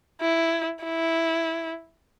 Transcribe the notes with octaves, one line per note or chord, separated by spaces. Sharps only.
E4
E4